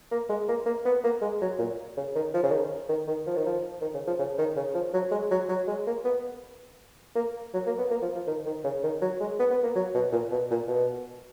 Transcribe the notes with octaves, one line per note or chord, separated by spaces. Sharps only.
A#3
G#3
A#3
A#3
B3
A#3
G#3
F#3
A#2
C#3
D#3
F3
C#3
D#3
D#3
D#3
F3
D#3
F3
D#3
C#3
F3
C#3
D#3
C#3
F3
F#3
G#3
F#3
F#3
G#3
A#3
B3
A#3
F#3
A#3
B3
A#3
F3
F3
D#3
D#3
C#3
D#3
F#3
G#3
B3
B3
A#3
F#3
B2
A#2
B2
A#2
B2